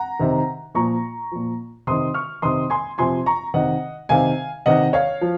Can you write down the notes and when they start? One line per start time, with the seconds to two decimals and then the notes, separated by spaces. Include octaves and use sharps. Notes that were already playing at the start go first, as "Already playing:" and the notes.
Already playing: F#5 A#5
0.19 C3 D#3
0.75 A#2 F3 A#5 C#6
1.32 A#2 F3
1.87 C3 D#3 C6 D#6
2.14 C#6 F6
2.42 C3 D#3 C6 D#6
2.70 G#5 C6
2.98 C3 F3 G#5 C6
3.26 A#5 C#6
3.54 C3 D#3 D#5 F#5
4.09 C3 D#3 F5 G#5
4.66 C3 D#3 D#5 F#5
4.93 C#5 F5
5.21 F3